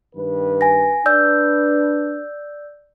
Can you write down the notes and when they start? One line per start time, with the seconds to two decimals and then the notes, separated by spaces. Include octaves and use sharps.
0.16 G2 D#3 B4
0.61 G#5 A#6
1.06 D4 B4 D5 E6 G6